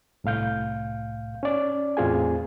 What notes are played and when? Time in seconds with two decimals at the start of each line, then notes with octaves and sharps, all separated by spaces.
0.24 C2 A2 F5 G6
1.43 C#4 D5
1.97 E2 A2 C4 F4 G#4 G#5